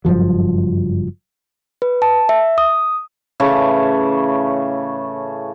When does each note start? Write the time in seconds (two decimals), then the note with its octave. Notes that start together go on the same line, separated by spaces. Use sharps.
0.05 F#1 G2 F3 F#3
1.82 B4
2.02 A5
2.29 E5
2.58 D#6
3.40 A2 C#3 E3 A3